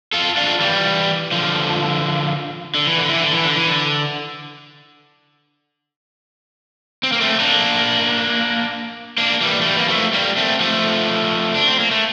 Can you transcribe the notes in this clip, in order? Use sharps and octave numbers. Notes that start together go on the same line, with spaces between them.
F4 A4
D4 F4
E3 G3
D3 F3
D3
E3
D3
E3
D3
E3
D3
E3
D3
C4
A#3
A3 C4
C4
A#3 D4
A#3 D4
E3 G3
A3
E3 G3
A#3
F3 A3
G3 A#3
A3 C4
F3 A3
D4
C4
A#3
A3